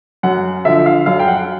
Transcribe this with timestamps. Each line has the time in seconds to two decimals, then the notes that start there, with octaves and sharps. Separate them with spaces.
0.23 F#2 F#5
0.65 D3 F3 E5
0.86 F5
1.06 F#2 F5
1.19 G5
1.28 F#5